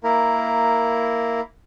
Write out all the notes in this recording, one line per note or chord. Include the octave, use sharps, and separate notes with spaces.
A#3 E4 A#4